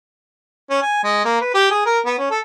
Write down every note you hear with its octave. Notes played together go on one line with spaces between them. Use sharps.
C#4
G#5
G#3
A#3
B4
G4
G#4
A#4
B3
C#4
A4